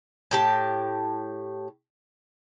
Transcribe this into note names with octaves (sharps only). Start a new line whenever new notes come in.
A2 G4 A5